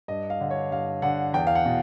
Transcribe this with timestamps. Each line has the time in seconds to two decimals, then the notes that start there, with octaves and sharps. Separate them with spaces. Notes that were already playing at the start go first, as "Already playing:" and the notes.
0.08 G2 D#5
0.30 F5
0.41 D3
0.51 C#5
0.71 G2 F5
1.02 D3 F#5
1.34 E2 G5
1.47 F5
1.55 F#5
1.65 B2